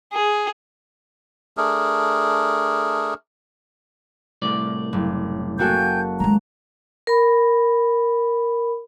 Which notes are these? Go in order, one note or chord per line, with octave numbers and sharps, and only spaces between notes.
G#4
A3 D4 G#4 A#4
C2 A2 D5
F#1
A#3 F#4 A4 G5 G#5 G6
D#3 G#3 A#5
A#4 B5